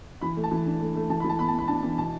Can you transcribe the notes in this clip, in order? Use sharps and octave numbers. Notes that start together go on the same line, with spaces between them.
E3 B5
A3
A5
E3
D4
A3
A3
E3 A5
E3 B5
A5
B3 B5
A5
B3 B5
D4 A5
E3
B2 A5